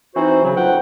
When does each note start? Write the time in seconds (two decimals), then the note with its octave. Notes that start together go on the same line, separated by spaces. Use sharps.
0.15 E3 C4 D#4 F#4 C5
0.44 C#3 F#3
0.56 D2 F3 F#4 B4 F#5 G5